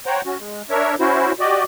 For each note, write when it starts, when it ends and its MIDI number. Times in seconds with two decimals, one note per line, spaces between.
0.06 0.21 72
0.06 0.21 73
0.06 0.21 78
0.06 0.21 79
0.06 0.21 82
0.26 0.37 61
0.26 0.37 66
0.39 0.62 56
0.70 0.95 62
0.70 0.95 70
0.70 0.95 73
0.70 0.95 76
1.00 1.32 61
1.00 1.32 64
1.00 1.32 66
1.00 1.32 72
1.40 1.64 66
1.40 1.64 67
1.40 1.64 74
1.40 1.64 75